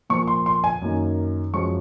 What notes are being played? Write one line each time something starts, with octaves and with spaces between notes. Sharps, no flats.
A#2 F3 A#3 C#6
C6
C6
G#5
F#2 D#3 A#3
F#2 F3 G#3 C#6